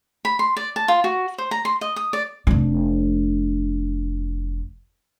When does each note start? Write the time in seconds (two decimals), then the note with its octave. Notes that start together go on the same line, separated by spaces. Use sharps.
0.25 B5
0.39 C6
0.57 D5
0.76 A5
0.88 F4
1.04 F#4
1.38 C5
1.51 A#5
1.65 C6
1.81 D#5
1.96 D#6
2.13 D5
2.47 F1 D4